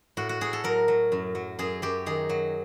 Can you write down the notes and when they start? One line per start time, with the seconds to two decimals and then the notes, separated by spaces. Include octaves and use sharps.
0.17 A2 F#4
0.29 F#4
0.41 A2 G#4
0.53 A4
0.64 F#3 A#4
0.88 F#3
1.12 F#2
1.35 F#3
1.59 F#2 G#4
1.82 F#2 G4
2.06 D#3 G#4
2.29 F#3